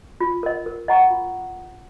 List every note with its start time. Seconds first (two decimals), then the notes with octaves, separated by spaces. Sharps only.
0.21 F4
0.43 A#4 D#5
0.66 A#4
0.88 D#5 F#5 A#5 C#6
1.10 F4